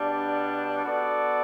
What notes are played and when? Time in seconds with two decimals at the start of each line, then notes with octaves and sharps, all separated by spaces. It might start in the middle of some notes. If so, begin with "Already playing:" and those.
Already playing: B2 G3 D4
0.84 B3 F#4 A4 D5